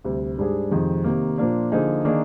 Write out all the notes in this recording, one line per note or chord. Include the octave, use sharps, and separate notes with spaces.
D2 C3 G3
G#2 G3 D4 G#4
F2 C3 D#3 G#3
C3 D#3 A#3
A#2 F3 A#3 D4
D3 F3 A#3 D#4 G#4
D#3 A#3 D4 G#4 D#5